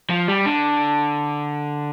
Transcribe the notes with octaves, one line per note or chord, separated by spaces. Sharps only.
F3
G3
D3